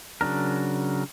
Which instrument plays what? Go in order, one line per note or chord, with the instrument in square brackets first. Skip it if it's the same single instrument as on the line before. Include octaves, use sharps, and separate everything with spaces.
[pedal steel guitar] C#3 F#3 D4 A#4